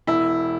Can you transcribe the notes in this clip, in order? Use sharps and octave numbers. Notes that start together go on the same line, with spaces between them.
E1 E4